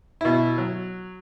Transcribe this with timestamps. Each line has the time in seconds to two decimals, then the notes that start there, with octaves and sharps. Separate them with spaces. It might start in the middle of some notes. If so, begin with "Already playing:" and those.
0.21 B2 E4
0.58 F#3